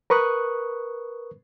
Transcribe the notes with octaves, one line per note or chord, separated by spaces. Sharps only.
A#4 B4 C#6 D#6 F#6